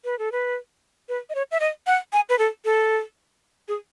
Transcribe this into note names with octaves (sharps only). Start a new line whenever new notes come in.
B4
A4
B4
B4
D#5
C#5
E5
D#5
F#5
G#5
B4
A4
A4
G#4